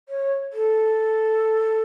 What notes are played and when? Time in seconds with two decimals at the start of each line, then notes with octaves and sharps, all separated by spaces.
0.09 C#5
0.53 A4